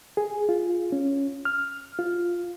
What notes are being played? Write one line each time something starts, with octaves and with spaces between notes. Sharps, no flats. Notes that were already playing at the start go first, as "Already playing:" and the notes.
G#4
F4
C#4
F6
F4